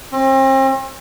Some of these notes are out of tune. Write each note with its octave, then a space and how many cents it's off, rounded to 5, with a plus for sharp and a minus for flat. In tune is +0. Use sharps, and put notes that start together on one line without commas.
C4 +40